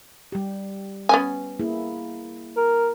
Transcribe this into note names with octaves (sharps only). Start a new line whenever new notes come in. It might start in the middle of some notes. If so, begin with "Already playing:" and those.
G3 G4
B3 C#4 G#5
A#3 E4 G#4
A#4